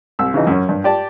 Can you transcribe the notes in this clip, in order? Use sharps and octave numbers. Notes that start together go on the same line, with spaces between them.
C2 E6
C#3 E3 D#4
F#2 C#4
G2
G4 D5 A5